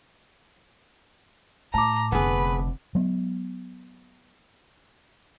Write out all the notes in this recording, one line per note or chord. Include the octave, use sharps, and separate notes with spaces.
A2 A5 A#5 D6
F1 D3 B3 G#4 B4
F#3 G#3 B3